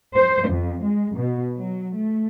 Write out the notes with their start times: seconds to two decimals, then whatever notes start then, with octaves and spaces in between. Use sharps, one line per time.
0.15 C5
0.49 F2
0.82 G#3
1.17 B2
1.55 F#3
1.94 A3